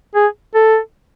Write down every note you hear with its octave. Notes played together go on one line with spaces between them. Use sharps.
G#4
A4